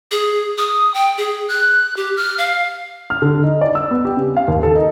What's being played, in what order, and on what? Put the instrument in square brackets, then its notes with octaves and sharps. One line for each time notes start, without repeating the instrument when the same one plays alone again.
[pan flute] G#4
D#6
G5
G#4
F#6
G4
F6
F5
[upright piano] F6
D3
D#4
D5
E6
B3
G4
C#3
F5
D#2
A4
D#4